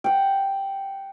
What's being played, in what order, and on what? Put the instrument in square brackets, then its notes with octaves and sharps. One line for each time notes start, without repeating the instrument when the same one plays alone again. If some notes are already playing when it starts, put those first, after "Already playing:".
[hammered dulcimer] F#5 G5